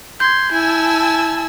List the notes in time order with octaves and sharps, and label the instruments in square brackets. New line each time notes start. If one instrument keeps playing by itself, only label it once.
[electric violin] C6 [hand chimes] G6 G#6
[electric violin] E4 [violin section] G#5 A5 E6